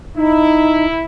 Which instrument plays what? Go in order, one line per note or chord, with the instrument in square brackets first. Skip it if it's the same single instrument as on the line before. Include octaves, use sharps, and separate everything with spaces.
[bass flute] D#4 [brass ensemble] E4